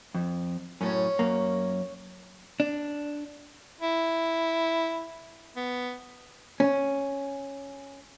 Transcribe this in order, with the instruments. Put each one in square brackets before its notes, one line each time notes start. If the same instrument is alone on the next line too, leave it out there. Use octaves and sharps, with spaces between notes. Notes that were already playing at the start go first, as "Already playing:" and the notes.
[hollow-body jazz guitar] F2
[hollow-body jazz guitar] F#2 A2 [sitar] C#4
[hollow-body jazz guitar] F#2 A#3
D4
[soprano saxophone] E4
B3
[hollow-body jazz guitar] C#4